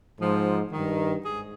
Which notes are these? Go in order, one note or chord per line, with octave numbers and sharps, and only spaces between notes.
G#2 F3
G2 D#3
G#2 G#4